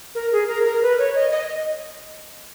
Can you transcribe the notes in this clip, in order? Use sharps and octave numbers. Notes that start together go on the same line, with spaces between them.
A#4
G#4
A#4
A#4
B4
C#5
D#5
D#5